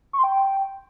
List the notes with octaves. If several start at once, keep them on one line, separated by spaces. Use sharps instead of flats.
C#6
C6
G5